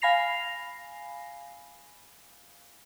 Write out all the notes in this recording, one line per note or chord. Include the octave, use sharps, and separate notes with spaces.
F5 G#5 B5 A#6 C7 F7